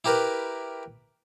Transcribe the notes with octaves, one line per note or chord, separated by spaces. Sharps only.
E4 G4 A#4 B4